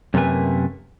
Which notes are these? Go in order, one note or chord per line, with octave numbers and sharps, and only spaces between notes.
F#2 C3 A3 A#3 B4 G#5